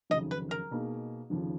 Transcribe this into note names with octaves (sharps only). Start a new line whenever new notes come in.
F1 D#2 C#3 F#3 D#5
B4
A#4
B2 A#3 D#4 G#4
F1 D#2 C#3 F3